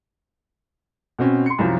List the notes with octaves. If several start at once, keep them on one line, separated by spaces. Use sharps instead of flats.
B2 C4 C#4
C6 C#7
C2 F#2 F3